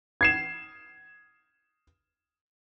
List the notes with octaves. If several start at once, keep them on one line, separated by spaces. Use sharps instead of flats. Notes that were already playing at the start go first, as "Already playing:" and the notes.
G#6 C7 E7